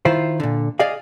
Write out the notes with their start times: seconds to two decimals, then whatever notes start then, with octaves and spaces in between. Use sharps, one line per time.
0.05 D#3 E4 F4 C5
0.40 A#2 D3
0.79 G#4 D5 D#5 F5